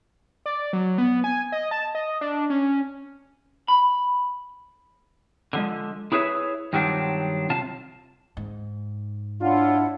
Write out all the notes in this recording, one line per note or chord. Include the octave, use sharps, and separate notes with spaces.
D5
F#3
B3
G#5
D#5
A5
D#5
D4
C#4
B5
D3 F3 G#3
E4 G#4 B4 C#5 E5
G2 D#3 F#3 C4 D4 F4
C3 F4 A5
G#2
D4 E4 F4 C#5 F#5